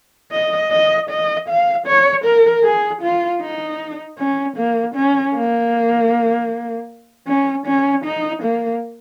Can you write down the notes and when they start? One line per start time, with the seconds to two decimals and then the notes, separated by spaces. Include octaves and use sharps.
0.32 D#5
0.71 D#5
1.10 D#5
1.48 F5
1.87 C#5
2.25 A#4
2.64 G#4
3.02 F4
3.41 D#4
4.18 C#4
4.57 A#3
4.95 C#4
5.35 A#3
7.27 C#4
7.66 C#4
8.05 D#4
8.42 A#3